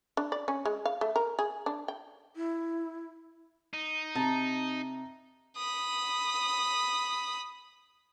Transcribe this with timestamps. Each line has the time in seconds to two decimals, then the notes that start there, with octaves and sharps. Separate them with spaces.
0.17 D4
0.32 D5
0.48 C#4
0.65 G#3
0.85 F5
1.01 A3
1.16 A#4
1.39 G#4
1.66 D4
1.88 G5
2.36 E4
3.74 D#4
4.15 C3 A5 A#5
5.57 B5 D#6